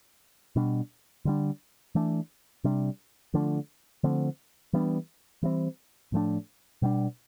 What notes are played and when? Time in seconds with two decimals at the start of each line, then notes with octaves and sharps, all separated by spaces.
0.56 B2 G3 D4
1.25 D3 G3 D4
1.95 E3 A3 D4
2.64 C3 G3 D4
3.34 D3 F3 A3 D4
4.03 D3 F3 A3 C4
4.73 E3 G3 B3 D4
5.43 E3 G3 C4
6.12 A2 F3 A3 D4
6.82 B2 G3 D4